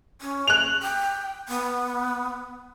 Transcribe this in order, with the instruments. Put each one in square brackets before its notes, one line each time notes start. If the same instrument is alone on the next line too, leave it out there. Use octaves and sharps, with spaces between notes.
[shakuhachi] C#4
[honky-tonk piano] F#6 F7
[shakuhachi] G5
B3